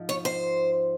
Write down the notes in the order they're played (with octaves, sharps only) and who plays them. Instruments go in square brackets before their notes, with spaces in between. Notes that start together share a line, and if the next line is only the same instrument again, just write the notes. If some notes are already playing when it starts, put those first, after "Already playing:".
Already playing: [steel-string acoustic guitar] G#2 F3
C#5
C5